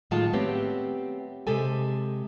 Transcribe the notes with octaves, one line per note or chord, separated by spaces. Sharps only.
A2 D#3 F#3 G#3 F4 A5
A3 B3 C4 G4 C#5
C3 G#3 G4 A4 G#5